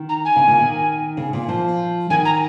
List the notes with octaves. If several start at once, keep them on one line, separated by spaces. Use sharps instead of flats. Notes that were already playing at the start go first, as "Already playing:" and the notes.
Already playing: D#3
A#5
G#5
C#3
A#2
D#3
C#3
A#2
F3
D#3 G#5
A#5